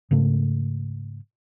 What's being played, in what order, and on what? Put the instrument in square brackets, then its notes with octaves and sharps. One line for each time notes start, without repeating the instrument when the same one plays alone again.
[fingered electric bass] G#2 C#3 A3